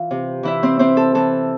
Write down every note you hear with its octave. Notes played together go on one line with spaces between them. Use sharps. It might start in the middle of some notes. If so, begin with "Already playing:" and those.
Already playing: E3 F4 F5
C3
E3 E4 E5
C4 C5
E3 C4 C5
A4
E3 A4